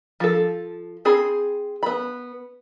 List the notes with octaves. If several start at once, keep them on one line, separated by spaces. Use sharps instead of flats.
F3 A4
C4 G#4 B5
B3 B5